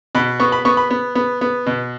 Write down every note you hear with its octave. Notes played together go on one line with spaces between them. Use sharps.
B2 B5
B3 C#6
B5
B3 C#6
B5
B3
B3
B3
B2